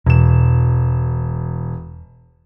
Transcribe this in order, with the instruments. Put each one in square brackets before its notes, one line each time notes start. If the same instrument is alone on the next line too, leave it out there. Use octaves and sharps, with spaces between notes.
[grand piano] E1 E7 [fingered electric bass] E2 B2